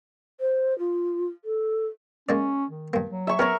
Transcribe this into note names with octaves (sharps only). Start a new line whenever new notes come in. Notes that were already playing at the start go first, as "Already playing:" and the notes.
C5
F4
A4
G#3 A#3 C#4 D5
D#3
G2 A#3
F#3
E5 C#6
B3 C#4 A#4 C#5